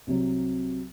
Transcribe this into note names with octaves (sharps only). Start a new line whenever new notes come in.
C2 C3 F#3